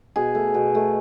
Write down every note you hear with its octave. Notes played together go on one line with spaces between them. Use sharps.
B2 G#4
A3
B2
A3